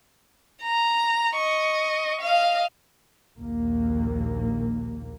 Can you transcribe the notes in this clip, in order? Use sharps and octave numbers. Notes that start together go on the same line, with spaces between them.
A#5
D#5 C#6
D#5 F5
A#1 D#2 A#3